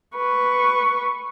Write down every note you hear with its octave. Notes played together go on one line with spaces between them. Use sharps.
B4 C#6